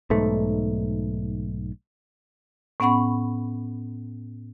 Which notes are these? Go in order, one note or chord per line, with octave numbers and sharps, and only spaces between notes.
B1 G#2 A3
A2 B3 C#4 F#5 B5 C#6